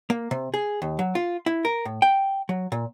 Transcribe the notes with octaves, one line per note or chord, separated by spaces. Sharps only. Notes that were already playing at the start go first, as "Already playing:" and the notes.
A#3
C3
G#4
D#2
F#3
F4
E4
A#4
A2
G5
F#3
A#2